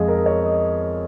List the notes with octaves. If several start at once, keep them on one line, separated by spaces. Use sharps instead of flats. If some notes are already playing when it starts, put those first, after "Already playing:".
Already playing: F2 G#3 G#4 D#5 F5
A#4
D#5
C#5
D#5